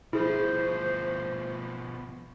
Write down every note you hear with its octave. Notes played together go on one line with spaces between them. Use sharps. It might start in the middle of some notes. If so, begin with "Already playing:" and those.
B2 F3 E4 G#4 C5